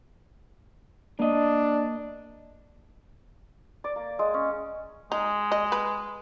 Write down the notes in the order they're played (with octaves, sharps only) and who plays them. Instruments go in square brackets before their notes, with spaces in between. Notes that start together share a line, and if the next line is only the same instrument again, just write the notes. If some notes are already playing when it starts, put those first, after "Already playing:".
[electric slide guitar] A#3 D#5 [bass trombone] D4
[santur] D5
A#3
G#3
C#4
[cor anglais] G#3 [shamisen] D#4
[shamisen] D#5
B4